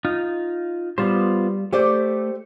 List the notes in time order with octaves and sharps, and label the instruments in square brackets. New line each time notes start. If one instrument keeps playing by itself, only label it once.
[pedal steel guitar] D#4 F4
[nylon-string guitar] G3 [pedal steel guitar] B3 F4 C5
[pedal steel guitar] A3 [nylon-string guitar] G4 C5 D5